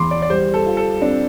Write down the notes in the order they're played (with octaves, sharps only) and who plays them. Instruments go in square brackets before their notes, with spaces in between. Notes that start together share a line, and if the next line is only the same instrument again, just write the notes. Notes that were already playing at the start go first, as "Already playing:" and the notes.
Already playing: [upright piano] E2 [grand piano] B5 C6 D6
[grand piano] D5
D5
[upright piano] G3 [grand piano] C5
[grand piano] A4
[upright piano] F4
[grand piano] A4
[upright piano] C4 [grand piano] D4